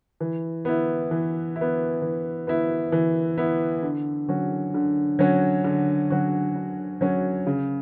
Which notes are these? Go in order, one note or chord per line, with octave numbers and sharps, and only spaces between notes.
E3
B3 E4
E3
E4
B3
E3
B3 E4
E3
B3 E4
D3
F#3 C#4 F#4
D3
F#3 C#4 F#4
D3
F#3 C#4 F#4
D3
F#3 C#4 F#4
C#3